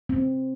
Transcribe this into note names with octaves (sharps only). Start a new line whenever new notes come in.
C4